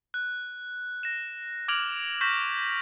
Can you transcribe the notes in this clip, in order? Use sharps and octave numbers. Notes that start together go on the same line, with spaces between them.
F#6
A#6 E7
D6 F6 G#6 D7 F7 F#7
C#6 F6 G6 A#6 B6 E7